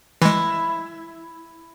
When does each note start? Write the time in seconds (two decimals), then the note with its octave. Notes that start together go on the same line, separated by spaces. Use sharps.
0.22 E3 G#3 E4